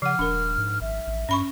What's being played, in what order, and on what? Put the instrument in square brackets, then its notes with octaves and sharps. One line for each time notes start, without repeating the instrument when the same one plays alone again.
[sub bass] C#3 [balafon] F3 F#5 [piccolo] F6
[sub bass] D#1 [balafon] D4 A#4
[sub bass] G#2
[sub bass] G#1 [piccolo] E5
[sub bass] A1
[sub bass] G2 [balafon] C#4 B5 C#6